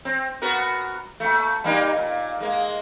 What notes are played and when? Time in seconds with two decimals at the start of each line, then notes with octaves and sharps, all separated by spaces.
0.05 C4
0.42 B3 F#4 A#4
1.20 A#2 A3
1.64 G3 A#3 D#4
1.97 A#2
2.40 G#3 A#3